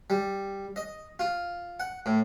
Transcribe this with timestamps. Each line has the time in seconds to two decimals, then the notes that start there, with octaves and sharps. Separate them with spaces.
0.10 G3
0.76 D#5
1.19 F4
1.80 F#5
2.06 A2